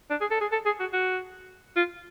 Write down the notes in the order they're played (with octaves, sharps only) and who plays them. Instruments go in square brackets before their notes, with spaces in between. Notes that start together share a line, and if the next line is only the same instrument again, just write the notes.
[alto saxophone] D4
G#4
A4
G#4
A4
G#4
F#4
F#4
F4